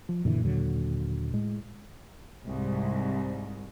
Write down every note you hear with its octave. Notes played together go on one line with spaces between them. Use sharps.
F3
F#2 A#2 D3 E3
D#2 D3 F#3
A2 G#3
C2 G#2